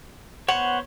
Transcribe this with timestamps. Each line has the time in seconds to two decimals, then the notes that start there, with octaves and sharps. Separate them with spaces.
0.48 B3 C5 C#5 F#5